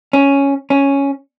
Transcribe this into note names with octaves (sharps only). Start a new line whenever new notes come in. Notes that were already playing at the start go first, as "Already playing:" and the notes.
C#4
C#4